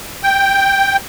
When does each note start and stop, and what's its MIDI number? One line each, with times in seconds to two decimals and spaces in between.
0.23 0.97 79